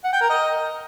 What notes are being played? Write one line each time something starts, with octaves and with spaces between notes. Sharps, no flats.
F#5
G5
A#4
D#5